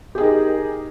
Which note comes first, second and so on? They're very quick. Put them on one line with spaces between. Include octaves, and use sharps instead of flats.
G4 G#4 D#4 A#4